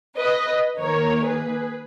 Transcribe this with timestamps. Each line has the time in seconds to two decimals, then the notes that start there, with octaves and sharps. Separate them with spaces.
0.17 B4 D#5
0.79 D#3 A#3 A#4 C#5
1.25 G#4 B4